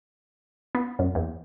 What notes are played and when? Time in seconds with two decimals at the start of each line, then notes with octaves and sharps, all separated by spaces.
0.75 B3
0.99 F#2
1.15 E2